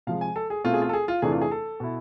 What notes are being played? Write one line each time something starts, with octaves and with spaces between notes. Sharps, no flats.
C3 F3 G#3 F5
G#5
A4
G#4
B2 A3 C4 F4
G#4
F4
A4
G#4
F4
E2 C3 E3 A3 D4 G#4
F4
G#4
A4
B2 B3 E4